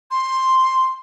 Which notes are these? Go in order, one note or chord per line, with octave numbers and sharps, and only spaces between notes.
C6